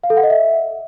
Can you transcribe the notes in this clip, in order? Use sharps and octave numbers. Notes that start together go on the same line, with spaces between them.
F5
A4
F#5
D#5
E5